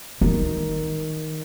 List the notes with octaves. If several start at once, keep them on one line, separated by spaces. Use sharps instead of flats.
D#3